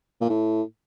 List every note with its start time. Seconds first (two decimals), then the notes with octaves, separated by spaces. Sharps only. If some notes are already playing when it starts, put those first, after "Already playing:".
0.21 A#2
0.29 A2